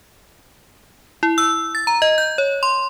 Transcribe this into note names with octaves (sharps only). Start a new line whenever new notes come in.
E4
E6
A6
A#5
D#5
G6
C#5
C6